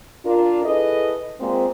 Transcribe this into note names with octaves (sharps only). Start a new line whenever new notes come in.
D4 F4 A#4
E4 G#4 A4 B4 D#5
A#2 G#3 C4